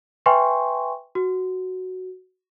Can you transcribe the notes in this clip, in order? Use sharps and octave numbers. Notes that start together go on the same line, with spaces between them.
B4 E5 G5 G#5 C6 C#6
F#4